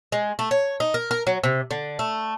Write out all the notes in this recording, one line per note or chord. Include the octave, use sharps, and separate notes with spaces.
G#3
A3
C#5
D#4
A#4
A#4
F#3
C3
D3
A3